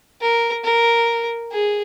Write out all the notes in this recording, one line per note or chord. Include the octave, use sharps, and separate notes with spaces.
A#4
A#4
G#4